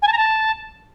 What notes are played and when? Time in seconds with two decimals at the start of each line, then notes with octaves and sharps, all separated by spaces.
0.02 G#5
0.07 A5
0.13 A#5
0.18 A5